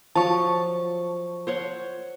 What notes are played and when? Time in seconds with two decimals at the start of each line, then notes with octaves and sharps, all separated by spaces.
0.15 F3 F#3 A5 C#6
1.47 C5 C#5 F#5